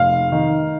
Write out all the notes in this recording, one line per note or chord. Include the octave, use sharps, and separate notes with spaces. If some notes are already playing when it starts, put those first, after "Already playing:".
Already playing: F1 F5
D#3